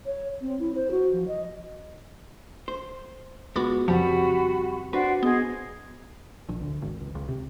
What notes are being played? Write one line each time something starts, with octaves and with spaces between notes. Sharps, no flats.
C#5
C4
E4
C5
F#4
F3
D#5
C5
C#2 G#3 B3 F4 F#4 B5 D6 A6
F2 C#3 F3 G3 F#4 G4 B5
D4 F#4 B4 C5 D5 F#5
B3 G#4 C5 D#5
A#1
D2
G#1
C#2
C#2
C3